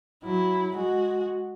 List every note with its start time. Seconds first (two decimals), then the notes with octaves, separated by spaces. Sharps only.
0.24 F#3 E4
0.76 G#3 F#4